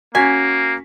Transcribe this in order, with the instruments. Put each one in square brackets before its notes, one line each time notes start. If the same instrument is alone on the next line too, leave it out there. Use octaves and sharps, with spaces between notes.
[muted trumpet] A#3 [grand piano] C#4 F#4 B6 [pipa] G#5